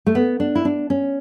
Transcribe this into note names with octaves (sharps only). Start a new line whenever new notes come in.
A3
B3
D4
E4
D4
C#4